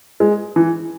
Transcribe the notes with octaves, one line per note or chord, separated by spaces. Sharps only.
G#3
E3